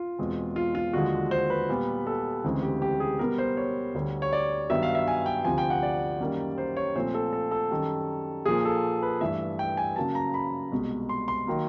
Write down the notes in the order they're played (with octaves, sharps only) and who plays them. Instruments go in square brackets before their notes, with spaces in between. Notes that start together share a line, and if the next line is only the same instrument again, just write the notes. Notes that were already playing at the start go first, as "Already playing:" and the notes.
Already playing: [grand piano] F4
E2 B2 G#3 C4
F4
F4
D#2 D3 F3 G#3 F#4
C5
B4
A#2 G3 B3
A4
D2 C#3 E3 G#3 C4
G4
G4
G#4
B2 G3 B3 A#4
C5
C#5
D2 D3 G3
C#5
D5
G2 D#3 F#3 B3 E5
F5
E5
G#5
G5
D2 C3 F3 G#5
G5
F#5
D5
F#2 D#3 G3 A#3
C5
C#5
A#2 F3 A3 C4 C5
A4
A4
A4
F#2 D#3 G3
A#2 F3 A#3 G#4
A4
B4
G2 E3 A3 E5
G5
G#5
F#2 C#3 F#3 A#3 A5
A#5
B5
C2 B2 G#3
C6
C6
D#3 F#3 A#3